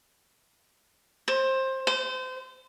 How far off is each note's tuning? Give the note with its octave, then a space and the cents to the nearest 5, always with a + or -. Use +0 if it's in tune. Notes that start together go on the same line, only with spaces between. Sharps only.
C5 +20
C5 -30